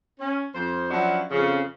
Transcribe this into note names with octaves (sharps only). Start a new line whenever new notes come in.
C#4
F2 C5
F3 F#3 C#4 D4 E4 F#4
F2 C#3